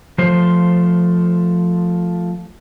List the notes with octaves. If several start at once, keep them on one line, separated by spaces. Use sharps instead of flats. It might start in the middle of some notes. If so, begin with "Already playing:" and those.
F3 A3 C5